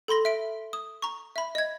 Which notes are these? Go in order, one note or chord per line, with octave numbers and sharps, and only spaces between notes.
A4 B5 C6 A#6
E5 D7
D#6
A#5 C#6
E5 B5
D#5 G#6